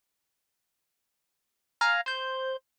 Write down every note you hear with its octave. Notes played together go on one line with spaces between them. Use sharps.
F5 G#5 A#5 F6
C5 G6